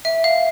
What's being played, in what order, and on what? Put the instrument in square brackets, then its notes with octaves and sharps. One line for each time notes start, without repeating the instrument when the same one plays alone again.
[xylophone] E5
F5